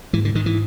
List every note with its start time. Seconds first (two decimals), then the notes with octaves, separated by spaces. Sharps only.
0.13 G#2 E3
0.25 D3
0.35 G#2 D#3
0.46 E3